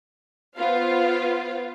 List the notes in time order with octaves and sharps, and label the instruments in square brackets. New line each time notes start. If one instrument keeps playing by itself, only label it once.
[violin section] B3 F4 C5 F5